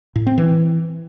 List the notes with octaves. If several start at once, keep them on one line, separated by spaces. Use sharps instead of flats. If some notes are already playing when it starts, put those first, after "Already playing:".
A2
C4
E3